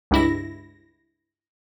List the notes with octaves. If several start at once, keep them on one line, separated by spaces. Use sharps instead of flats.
C#2 G2 E4 A#6